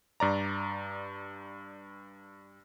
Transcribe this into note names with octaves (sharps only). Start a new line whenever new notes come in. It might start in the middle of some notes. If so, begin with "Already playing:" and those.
G2 D5 A#5